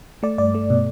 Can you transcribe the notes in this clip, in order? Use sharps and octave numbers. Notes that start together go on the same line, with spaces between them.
A3 D5
G2 D5
A3
B2